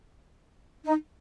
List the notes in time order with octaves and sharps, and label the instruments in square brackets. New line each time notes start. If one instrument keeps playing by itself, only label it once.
[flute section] D#4